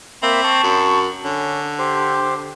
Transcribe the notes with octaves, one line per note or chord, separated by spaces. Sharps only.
A#3 C4 E5 B5
A5 C#6
F#2
D3 C#4
G4 C5